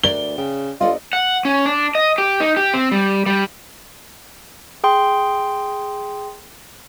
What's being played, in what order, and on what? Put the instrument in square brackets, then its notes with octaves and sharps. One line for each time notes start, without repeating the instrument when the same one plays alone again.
[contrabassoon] D2 [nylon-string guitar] A#4 D5 [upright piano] G7
[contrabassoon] C#3 [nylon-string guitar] G5
[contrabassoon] G1 [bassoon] F4 [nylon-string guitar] A4 D5 D#5
[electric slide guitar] F#5
C#4
D4
D#5
G4
D#4
G4
C4
G3
G3
[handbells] G#4 G5 C6